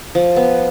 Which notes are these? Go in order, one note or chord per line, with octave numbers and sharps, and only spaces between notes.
F3
B3